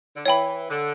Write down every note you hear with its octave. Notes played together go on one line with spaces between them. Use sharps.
D3
E3 C#5 G5 B5
D3